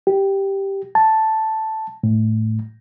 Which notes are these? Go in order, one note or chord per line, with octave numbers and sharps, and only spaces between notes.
G4
A5
A2